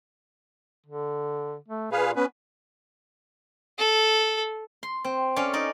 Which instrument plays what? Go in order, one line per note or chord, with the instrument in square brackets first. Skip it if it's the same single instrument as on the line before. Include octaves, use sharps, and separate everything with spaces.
[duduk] D3
A3
[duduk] A#2 [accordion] G#4 B4 F5
[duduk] B3 [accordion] C#4 B4
[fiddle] A4
[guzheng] C6
C4
C#4 A4 D5 F5
D#4 D5 D#5